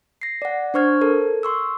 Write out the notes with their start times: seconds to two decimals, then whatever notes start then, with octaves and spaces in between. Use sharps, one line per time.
0.22 A#6 C7
0.42 D5 F#5
0.74 D4 C5 C#6 F6 G#6
1.01 A4 A#4
1.43 C6 C#6 E6